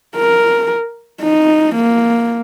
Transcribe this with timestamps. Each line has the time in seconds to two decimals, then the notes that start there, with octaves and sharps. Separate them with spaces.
0.16 A#4
1.22 D#4
1.75 A#3